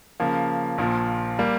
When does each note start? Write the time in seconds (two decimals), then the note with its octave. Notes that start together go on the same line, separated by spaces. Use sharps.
0.20 C#3 F3 A#3
0.78 A#1 A#2 F3
1.39 G3 A#3